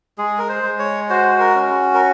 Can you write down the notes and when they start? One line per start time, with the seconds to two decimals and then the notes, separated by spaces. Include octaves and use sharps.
0.18 G#3 G#4
0.38 A#4
0.49 C5
0.63 G#3
0.79 C#5
1.10 F#4 C5
1.40 A#4
1.55 C#4
1.94 A#4